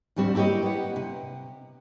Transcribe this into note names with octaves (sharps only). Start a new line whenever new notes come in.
D2 G#2 G3 C4 F#4
A#3 E4 G4 C#5 D#5
B4 F#5
C3